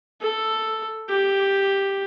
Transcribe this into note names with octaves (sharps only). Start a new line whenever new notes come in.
A4
G4